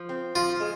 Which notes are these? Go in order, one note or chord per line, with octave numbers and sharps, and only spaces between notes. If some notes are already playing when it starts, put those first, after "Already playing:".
Already playing: F3
C4
F3 F4
G#3